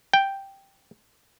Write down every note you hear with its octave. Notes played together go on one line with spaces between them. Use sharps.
G5